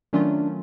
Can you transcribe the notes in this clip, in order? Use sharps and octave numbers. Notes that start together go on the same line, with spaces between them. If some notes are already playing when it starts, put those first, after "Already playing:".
D#3 F#3 A3 C#4 D4 F4